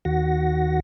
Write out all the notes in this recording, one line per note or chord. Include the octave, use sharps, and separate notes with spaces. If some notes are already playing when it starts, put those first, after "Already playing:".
D#2 D#3 F#4 F#5 A#6